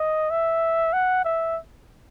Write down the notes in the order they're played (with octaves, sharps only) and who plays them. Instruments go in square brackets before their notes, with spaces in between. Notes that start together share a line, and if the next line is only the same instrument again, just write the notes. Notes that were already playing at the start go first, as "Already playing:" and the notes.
Already playing: [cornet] D#5
E5
F#5
E5